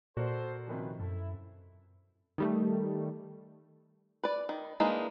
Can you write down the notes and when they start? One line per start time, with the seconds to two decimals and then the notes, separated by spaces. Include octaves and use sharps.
0.17 A#2 F#4 A4 A#4 C5 D5
0.67 C3 D#3 F3 C#4 F#4 B4
1.00 F#2 E4 A4
2.38 D#3 G3 A3
4.23 B4 D5
4.49 D#3
4.80 E3 G#3 A#3 D4 D#4